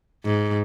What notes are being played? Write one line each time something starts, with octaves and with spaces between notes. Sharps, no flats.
G#2